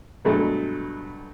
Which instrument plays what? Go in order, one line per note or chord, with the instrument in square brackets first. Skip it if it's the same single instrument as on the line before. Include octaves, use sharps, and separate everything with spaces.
[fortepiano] G2 B2 F#3 G#3 A3